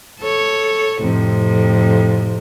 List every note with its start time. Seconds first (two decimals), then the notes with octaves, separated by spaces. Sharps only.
0.20 A4 C#5
1.00 F2 A2 C3